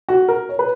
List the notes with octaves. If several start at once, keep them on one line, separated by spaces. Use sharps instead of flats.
F#4
A#4
C#5
B4